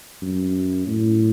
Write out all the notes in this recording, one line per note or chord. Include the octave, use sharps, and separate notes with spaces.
F#2
A2